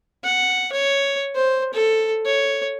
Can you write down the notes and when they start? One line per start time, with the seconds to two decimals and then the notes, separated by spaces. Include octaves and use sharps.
0.24 F#5
0.73 C#5
1.35 C5
1.74 A4
2.26 C#5